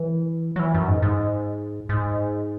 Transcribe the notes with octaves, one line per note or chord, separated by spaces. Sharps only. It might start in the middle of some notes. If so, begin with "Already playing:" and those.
Already playing: E3
F#3
E3
F#2
G#2
G#2
G#2